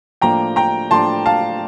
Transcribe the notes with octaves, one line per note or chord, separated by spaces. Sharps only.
A2 F3 A#3 D4 G5 A#5
G5 A#5
A2 F3 A#3 D4 A5 C6
F5 A5